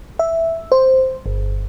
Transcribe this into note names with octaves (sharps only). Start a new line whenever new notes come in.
E5
C5
G1